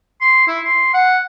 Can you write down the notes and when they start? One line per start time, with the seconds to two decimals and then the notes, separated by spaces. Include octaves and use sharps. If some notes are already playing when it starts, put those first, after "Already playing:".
0.21 C6
0.47 E4
0.65 C6
0.94 F#5